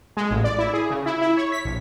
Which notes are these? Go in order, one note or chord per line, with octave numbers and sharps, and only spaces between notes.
G#3
A1
D5
E4
G#4
C#3
E4
E4
C#5
B6
A#1